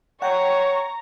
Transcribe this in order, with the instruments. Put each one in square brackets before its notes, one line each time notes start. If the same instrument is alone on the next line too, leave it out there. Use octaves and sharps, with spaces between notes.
[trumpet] C#5 [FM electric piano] F#5 G5 [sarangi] A#5 [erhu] C#6